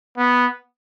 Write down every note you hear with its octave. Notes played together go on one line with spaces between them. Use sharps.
B3